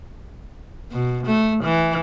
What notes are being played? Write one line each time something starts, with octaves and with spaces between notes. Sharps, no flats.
B2
A3
E3